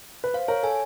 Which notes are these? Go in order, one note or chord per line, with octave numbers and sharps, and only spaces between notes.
B4
C5 F5
A#4 C#5
A4 G#5